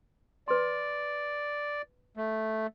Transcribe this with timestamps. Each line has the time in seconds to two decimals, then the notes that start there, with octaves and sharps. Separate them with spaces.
0.48 B4 D5 C6
2.17 A3